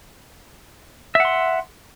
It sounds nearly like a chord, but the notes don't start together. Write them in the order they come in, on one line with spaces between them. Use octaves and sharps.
E5 F#5 C6